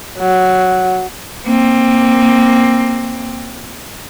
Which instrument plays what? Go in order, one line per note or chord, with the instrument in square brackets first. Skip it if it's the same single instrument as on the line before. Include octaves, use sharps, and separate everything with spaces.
[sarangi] F#3
[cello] A#3 C4